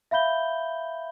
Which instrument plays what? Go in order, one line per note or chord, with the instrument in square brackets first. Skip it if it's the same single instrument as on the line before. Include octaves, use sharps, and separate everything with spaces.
[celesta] E5 F5 B5 G6 G7